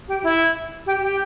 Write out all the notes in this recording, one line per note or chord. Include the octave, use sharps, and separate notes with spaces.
G4
E4
G4
G4